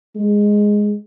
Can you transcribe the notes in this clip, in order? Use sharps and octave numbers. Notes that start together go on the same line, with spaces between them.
G#3